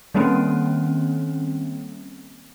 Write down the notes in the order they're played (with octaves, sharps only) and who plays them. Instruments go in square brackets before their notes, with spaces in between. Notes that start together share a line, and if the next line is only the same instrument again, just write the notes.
[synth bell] D#3 G3 A#3 C4 C#4